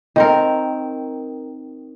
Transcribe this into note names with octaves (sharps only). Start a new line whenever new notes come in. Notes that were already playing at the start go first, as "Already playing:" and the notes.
D#3 C4 A#4